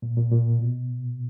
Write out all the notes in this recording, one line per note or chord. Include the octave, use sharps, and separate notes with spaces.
A#2
A#2
A#2
B2